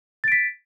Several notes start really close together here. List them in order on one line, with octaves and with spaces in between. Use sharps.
A6 D7 B6